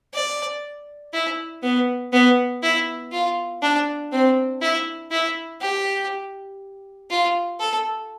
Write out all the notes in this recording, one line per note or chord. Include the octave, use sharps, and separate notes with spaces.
D5
E4
B3
B3
E4
F4
D4
C4
E4
E4
G4
F4
A4